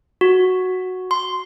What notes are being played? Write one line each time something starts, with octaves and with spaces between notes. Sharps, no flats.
F#4
C6